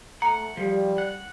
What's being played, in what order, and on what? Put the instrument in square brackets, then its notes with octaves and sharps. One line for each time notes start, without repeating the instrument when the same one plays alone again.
[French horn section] A3 [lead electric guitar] F#5 [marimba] A#5
[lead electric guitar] F3 [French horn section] G3
[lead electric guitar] F#5